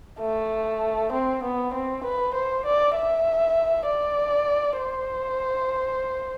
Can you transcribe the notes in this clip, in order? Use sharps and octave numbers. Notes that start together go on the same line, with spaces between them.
A3
C4
B3
C4
B4
C5
D5
E5
D5
C5